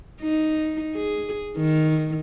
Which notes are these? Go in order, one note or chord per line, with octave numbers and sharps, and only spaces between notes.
D#4
G#4
D#3